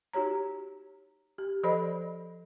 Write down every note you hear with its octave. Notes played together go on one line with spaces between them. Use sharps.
D#4 F#4 G4 C#5 A#5
G4
F3 A4 C5 D5 D#5 B5